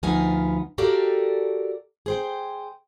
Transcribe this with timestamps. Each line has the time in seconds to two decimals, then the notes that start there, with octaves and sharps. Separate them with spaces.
0.03 D2 F3 B3 D#4 F5 G#5
0.78 F#4 G4 A4 A#4 D5 F5
2.06 G#4 C5 G5